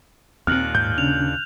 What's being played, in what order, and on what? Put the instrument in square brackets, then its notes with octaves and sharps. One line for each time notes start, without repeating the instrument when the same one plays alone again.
[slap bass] D#2 A#2 [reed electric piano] C4 [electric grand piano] F6 [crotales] F#6 F#7
[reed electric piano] G#2 [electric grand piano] G6
[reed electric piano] C#3 C#4 D4 [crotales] F7